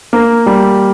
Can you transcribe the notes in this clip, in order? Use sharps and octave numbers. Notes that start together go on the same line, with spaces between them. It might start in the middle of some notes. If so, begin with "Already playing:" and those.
A#3
G3